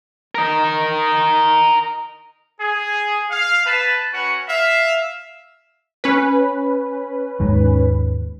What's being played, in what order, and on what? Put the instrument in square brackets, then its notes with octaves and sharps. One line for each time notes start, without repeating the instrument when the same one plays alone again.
[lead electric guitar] A#4 D#5
[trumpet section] G#4
F5
B4 A5
C#4 F#4 B4 F#5
E5 F5
[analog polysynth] C#4 B4
[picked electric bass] D#2 G#2